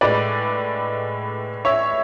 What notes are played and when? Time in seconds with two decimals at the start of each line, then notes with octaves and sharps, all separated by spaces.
0.01 A2 G#3 B4 D5
1.65 C#5 E5